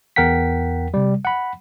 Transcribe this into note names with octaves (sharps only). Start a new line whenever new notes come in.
E2 A#4 F#5 G5 B6
C3 G3
F#5 B5